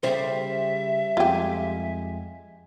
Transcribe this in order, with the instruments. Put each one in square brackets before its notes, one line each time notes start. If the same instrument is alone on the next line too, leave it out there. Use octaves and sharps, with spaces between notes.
[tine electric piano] C#3 [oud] G3 C5 [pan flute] E5
[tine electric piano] F2 G#3 G#5 [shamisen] F4 G4